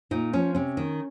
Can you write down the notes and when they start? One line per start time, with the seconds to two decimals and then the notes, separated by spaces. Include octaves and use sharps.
0.11 A#2 D#4
0.33 F3 C#4
0.55 C3 C#4
0.77 D#3